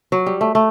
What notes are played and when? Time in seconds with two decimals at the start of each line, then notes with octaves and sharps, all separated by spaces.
0.12 F#3
0.26 G3
0.41 A3
0.55 A3